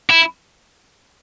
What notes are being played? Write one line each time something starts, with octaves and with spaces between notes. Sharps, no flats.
E4